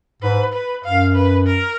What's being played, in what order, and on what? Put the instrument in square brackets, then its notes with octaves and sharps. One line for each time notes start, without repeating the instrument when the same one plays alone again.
[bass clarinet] G#2 [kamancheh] B4
[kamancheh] B4
[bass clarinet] F#2 [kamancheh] F5
[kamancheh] B4
A#4